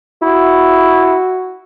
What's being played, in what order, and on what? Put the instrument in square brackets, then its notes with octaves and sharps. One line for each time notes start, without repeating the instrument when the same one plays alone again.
[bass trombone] E4 [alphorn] F#4